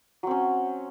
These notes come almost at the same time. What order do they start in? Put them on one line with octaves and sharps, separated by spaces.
F#3 C4 C#4